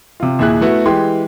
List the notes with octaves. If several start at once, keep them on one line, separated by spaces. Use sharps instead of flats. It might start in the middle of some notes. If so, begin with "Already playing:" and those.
C3 F4
D#2 A#2 E4 G#4 F#6
A3 B3 E4 F#4
E3 G#3 G4 C6